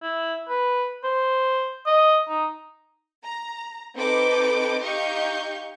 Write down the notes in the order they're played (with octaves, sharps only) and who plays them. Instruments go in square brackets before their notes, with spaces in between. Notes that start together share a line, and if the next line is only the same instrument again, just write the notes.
[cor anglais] E4
B4
C5
D#5
D#4
[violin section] A#5
C4 D#4 A4 B4 D6 G6
D#4 G4 D#5 F5 C#6 G6